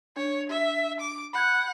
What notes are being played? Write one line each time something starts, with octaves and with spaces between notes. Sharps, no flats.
D4 C#5
E5
D6
F#5 B5 G6 G#6